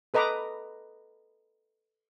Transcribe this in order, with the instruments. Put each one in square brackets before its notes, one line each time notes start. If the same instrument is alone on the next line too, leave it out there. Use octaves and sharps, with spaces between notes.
[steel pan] A4 B4 D#5 A#5 B5 D6